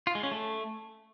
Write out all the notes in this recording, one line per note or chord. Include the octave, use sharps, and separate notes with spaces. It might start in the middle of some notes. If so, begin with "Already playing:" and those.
F4
G#3
C#4
A3